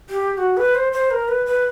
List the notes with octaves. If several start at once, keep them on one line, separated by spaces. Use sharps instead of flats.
G4
G4
F#4
B4
C5
C5
A#4
B4
B4